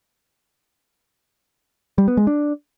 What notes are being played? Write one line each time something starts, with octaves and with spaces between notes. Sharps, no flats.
G3
B3
G#3
D4